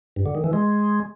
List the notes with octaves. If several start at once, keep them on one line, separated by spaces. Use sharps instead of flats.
G2
D3
D#3
E3
G#3